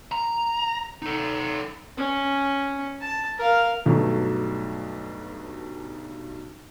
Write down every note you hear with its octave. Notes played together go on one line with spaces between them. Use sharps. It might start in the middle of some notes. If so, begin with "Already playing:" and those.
A#5
D#4 A4
C#4
A5
A#4 F5
B1 G2 F#3 A3